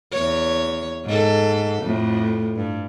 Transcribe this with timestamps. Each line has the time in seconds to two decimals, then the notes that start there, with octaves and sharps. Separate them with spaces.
0.12 E2 C#5
1.05 G#2 A4
1.82 F2 A2
2.56 G2